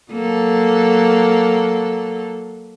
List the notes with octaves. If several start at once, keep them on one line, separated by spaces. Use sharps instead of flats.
F#3 A#3 A4